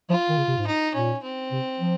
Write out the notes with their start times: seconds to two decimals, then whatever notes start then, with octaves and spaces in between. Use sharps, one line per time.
0.09 F3 F4
0.29 D#3
0.38 C#3
0.48 C3
0.57 G#2
0.66 D#4
0.94 A#2 C#4
1.23 C4
1.52 C3
1.79 F3